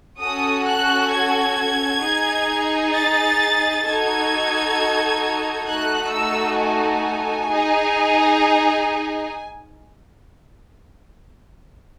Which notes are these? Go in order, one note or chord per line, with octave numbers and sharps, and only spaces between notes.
C#4 F#4 A4 D#6
F#6
G#6
D#4 G#4
A6
D#4 F#4 A4 G#6
A3 D#4 F#4 A4 F#6
E6
G#5
D#4 G#4